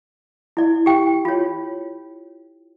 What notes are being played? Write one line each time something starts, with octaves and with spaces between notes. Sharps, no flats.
E4 D5
G4 G5
F4 C#5